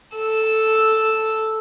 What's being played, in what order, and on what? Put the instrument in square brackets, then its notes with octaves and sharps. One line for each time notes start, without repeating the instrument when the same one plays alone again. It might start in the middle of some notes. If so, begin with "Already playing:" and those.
[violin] A4 E6